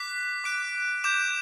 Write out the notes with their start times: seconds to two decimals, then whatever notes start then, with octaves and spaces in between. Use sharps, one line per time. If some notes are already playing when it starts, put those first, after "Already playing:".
Already playing: D6 F#6 B6
0.44 D6 F#6 D7
1.04 D6 G6 E7